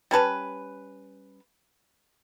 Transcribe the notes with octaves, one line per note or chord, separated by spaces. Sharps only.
G3 C#4 B4 A5